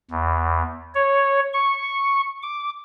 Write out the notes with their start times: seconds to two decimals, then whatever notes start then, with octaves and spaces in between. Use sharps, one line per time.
0.11 E2
0.95 C#5
1.53 C#6
2.43 D6